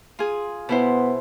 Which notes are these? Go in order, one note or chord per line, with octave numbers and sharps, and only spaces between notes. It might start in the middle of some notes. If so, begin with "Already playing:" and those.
F4 G#4
B2 B3 E4 C5